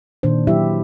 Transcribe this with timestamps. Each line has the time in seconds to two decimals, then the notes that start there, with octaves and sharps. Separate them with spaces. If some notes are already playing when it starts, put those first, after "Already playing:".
0.23 A#2 D#3 D4 C5
0.47 F#3 E4 G4 E5